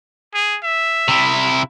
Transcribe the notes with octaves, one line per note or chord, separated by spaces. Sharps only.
G#4
E5
C3 E4